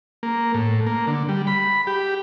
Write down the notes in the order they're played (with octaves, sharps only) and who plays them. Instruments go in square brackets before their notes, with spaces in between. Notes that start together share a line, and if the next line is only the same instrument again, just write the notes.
[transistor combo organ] A#3
A2
A#3
D3
G3
B5
G4